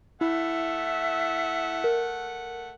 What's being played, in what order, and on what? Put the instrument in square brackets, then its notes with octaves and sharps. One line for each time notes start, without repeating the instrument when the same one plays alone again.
[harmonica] A3 F#5 [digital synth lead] E4 [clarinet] E5
[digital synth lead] A#4